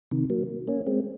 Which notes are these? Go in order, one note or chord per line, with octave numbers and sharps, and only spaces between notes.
C3 D#3
F#3 A#3
A#3 C#4
G#3 C4